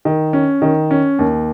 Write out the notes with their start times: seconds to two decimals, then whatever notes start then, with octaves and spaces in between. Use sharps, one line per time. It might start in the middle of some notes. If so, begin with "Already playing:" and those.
0.05 D#3
0.33 C#4
0.62 D#3
0.91 C#4
1.19 D#2